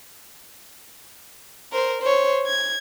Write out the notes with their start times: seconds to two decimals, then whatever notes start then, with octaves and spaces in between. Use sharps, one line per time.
1.72 A#4 C5
2.02 C5 C#5
2.46 G#6